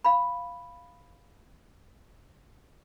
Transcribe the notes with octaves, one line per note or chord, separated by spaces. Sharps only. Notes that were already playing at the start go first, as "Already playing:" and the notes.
F5 B5